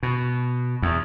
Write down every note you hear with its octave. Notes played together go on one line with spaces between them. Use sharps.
B2
E2